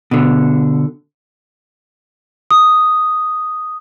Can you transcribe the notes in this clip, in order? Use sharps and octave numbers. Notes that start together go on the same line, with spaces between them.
B2 D3
D#6